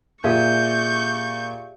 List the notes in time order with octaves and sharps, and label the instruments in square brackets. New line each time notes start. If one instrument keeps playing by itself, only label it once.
[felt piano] A#2 [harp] G4 G#4 E5 [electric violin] C#6 G6